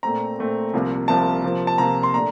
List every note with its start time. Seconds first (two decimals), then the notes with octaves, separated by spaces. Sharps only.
0.03 A#2 A3 C4 A#5
0.39 A#2 A3 C4
0.73 C2 C3 F3 A#3
1.08 C2 C3 F3 A#3 A5
1.44 C3 F3 A#3
1.67 A5
1.78 C3 F3 A#3 A#5
2.03 C6
2.13 A#2 A3 D4 A#5